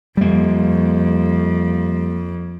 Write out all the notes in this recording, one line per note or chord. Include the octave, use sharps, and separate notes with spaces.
F2 G3 A#3